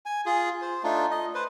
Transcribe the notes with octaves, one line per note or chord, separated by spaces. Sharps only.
G#5
F4 G#4
C5
A3 D4 D#4 F4
D#5
B4 C5